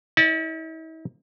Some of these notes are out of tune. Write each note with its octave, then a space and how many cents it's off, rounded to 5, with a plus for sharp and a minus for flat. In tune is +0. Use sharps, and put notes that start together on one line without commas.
E4 -45 D5 +0